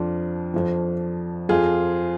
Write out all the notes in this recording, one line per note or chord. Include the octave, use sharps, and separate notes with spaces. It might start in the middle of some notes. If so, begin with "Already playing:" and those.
Already playing: F2 F3 D4 F4
F2 F3
F2 F3 F4 G#4